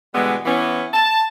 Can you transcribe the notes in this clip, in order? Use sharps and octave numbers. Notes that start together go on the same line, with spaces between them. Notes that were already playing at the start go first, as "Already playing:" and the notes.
B2 D3 E3 G3 G#3 B3
E3 B3 C#4
A5